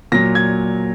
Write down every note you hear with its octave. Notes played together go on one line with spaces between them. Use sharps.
A#2 F#3 A#6
G#6